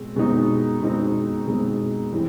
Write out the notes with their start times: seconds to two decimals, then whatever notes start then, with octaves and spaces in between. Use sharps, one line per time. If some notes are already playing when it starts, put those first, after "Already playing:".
Already playing: B2 G#3 C4
0.16 B2 G#3 C4 D#4
0.81 B2 G#3 C4 D#4
1.46 B2 G#3 C4 D#4
2.12 E3 G3 C4 E4